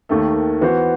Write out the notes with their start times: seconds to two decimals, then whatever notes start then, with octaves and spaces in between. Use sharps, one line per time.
0.09 D#2 D#3 A3
0.61 E3 B3 F#4 C5